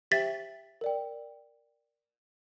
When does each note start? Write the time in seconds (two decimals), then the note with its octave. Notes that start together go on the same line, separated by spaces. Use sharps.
0.11 G4 C5 E5 G5 A6 B6
0.81 A#4 D5 G5